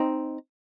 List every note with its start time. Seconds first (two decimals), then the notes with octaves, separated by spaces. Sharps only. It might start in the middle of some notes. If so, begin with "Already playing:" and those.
Already playing: C4 D#4